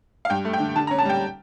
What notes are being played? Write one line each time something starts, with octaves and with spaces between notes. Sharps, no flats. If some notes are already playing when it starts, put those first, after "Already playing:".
F5
G2 G5
A3
G5
D3
D3 A5
A#5
C#4
A5
G3 G5